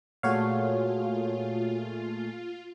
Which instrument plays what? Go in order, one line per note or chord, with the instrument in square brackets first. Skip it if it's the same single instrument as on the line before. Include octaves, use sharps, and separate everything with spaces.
[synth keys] A#2 A3 G#4 [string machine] F4 [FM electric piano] F#4 C#5 F5